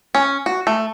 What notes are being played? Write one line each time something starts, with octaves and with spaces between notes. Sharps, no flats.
C#4
F#4
A3